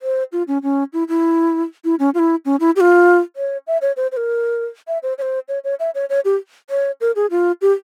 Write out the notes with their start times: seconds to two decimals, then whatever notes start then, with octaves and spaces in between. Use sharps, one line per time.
0.02 C5
0.32 F4
0.48 C#4
0.63 C#4
0.93 E4
1.09 E4
1.84 E4
1.99 C#4
2.14 F4
2.19 E4
2.45 C#4
2.60 E4
2.76 G4
2.80 F4
3.36 C#5
3.67 E5
3.82 C#5
3.97 C5
4.12 C5
4.17 A#4
4.88 E5
5.03 C5
5.18 C#5
5.22 C5
5.48 C#5
5.64 C#5
5.80 E5
5.95 C#5
6.10 C#5
6.25 G4
6.70 C#5
7.01 A#4
7.16 G#4
7.31 F4
7.61 G4